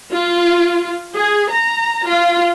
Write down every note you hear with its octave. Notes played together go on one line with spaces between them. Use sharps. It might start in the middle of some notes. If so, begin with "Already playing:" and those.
F4
G#4
A#5
F4